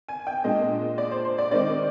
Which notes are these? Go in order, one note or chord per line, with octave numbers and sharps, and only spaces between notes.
G#5
G5
A#2 G#3 D4 D#5
D5
C5
C5
D5
D#3 G#3 C4 D#4 D5